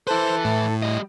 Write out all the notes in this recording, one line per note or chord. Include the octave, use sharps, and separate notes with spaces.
E4 A4 B4 C5
A2
G3 D#5